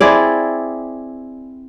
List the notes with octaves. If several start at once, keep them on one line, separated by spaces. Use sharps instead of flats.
C4 E4 G#4 D5